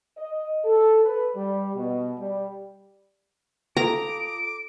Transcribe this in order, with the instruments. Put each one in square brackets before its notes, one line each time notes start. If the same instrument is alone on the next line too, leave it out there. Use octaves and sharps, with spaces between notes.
[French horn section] D#5
A4
B4
G3
B2
G3
[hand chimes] F4 A4 [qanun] A#5 [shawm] D6